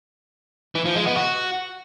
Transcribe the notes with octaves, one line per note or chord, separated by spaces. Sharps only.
E3
F3
G#3
B3
F#4